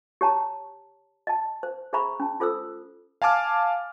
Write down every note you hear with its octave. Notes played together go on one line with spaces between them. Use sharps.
G4 C#5 A5 A#5
D#5 A5
C5
G#4 C5 E5 A#5 B5 C#6
C#4 A5
F4 A4 C5 D#6 E6
F5 G#5 A5 D6 F6